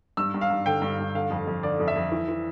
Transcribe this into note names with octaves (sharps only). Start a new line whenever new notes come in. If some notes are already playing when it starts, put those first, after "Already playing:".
G2 E6
G2
F5
G2
D3 G5
G2
G2
D3 F5
F2
F2
D3 D5
F2
E5
F2
E3
E3